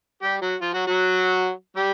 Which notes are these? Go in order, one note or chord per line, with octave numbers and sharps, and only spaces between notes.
G3 G4
F#3 F#4
F3 F4
F#3 F#4
F#3 F#4
G3 G4